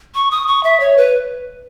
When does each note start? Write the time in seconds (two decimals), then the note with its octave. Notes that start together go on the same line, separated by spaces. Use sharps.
0.15 C#6
0.31 D#6
0.47 C#6
0.64 E5
0.80 C#5
0.97 B4